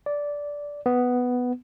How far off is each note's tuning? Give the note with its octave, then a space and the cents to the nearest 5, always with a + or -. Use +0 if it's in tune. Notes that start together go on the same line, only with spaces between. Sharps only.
D5 -10
B3 +5